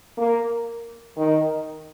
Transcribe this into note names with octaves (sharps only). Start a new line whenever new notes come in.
A#3
D#3